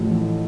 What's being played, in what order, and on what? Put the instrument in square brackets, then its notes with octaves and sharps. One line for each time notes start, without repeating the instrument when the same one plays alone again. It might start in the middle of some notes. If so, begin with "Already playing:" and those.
Already playing: [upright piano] A1 A2 F3